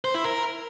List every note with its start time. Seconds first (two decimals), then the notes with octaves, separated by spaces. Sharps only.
0.05 C5
0.14 E4
0.24 A#4